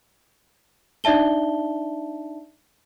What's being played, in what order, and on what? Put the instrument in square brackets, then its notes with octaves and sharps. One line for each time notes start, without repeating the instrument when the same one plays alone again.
[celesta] D4 D#4 D5 E5 A5 G7